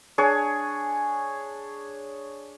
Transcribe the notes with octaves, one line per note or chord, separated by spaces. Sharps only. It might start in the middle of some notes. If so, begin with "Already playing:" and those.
D4 G#4 C#5